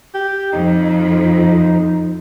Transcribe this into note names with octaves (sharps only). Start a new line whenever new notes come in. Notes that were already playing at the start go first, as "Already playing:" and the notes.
G4
F2 D#4